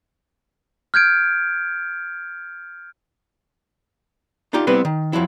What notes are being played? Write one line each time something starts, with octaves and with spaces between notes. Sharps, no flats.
F6 G6 G#6 D7
D4 D#4 F4 G4
G3 B3 C4 E4 B4 C5
D#3
F2 F3 F#3 E4